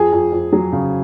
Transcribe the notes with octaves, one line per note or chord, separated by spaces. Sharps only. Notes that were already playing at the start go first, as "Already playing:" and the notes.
Already playing: F2 G#4
F2
F2
F#3
C#3